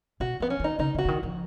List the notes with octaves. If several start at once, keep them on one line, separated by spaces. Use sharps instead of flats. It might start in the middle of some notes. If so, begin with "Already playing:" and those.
B2 F#4
F3 B3
C#4
D#3 D#4
C#3 D#4
C#3
F#4
C#3
D#3
F3